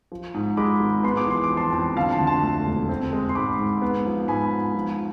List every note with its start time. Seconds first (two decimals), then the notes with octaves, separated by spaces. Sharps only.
0.12 F3
0.34 G#2
0.57 G#3 B5 D6
0.80 G#1
1.03 B3 C6
1.17 D6
1.27 E3 C6
1.44 D6
1.50 F2
1.57 A5 C6
1.73 F2
1.97 D3 F5 A5
2.12 A5 C6
2.20 D2
2.27 A5 C6
2.43 A3
2.66 E1
2.89 C4
3.13 G#3
3.29 C6
3.35 G#2 B5 D6
3.59 G#2
3.82 B3
4.06 F3
4.28 G#2 G#5 B5
4.51 G#2
4.74 F3